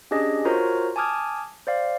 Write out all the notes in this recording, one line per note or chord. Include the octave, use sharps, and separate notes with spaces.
C#4 D4 G4 G#4 D#5
F4 F#4 A#4 C5 C#5 A#5
G#5 A5 D6 D#6 F6 G#6
C5 D5 F5